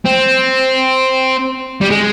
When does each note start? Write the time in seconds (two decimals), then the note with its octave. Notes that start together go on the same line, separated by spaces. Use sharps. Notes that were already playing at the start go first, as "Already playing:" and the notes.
0.05 C4
1.81 G3
1.91 G#3